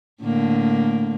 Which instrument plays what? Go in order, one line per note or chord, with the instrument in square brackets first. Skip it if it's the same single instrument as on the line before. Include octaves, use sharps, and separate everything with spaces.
[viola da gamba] A2 D3 A#3